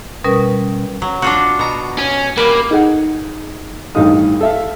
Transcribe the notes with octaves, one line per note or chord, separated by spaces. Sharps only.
B2 G3 C#4 A#4 B4
F#3
D4 F4 F#4
B2 A#5
C#4
G3 A#3 B4
D#4 G#4 F#5
A1 G2 D#3 D#4 F5 D#6
A4 E5 F5